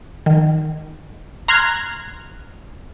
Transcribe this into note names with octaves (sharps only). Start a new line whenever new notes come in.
D#3
A#5 C6 F6 F#6 G#6